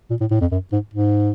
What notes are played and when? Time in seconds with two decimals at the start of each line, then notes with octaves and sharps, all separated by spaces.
0.10 A#2
0.20 A2
0.31 A2
0.41 F2
0.52 F#2
0.72 G#2
0.94 G#2